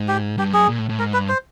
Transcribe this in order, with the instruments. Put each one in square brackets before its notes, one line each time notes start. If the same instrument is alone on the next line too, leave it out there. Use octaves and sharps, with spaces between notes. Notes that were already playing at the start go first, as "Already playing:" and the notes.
Already playing: [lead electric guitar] G#2
[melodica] G4
[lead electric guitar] G2 [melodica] G4
[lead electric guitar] F#2 [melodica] G#4
[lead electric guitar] A#2
A2
A2
[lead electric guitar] G#2 [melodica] A#4
[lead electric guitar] G2 [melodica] B4
[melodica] C5